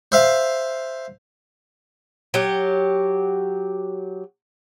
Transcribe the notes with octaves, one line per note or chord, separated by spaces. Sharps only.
C5 E5 F5
F#3 G4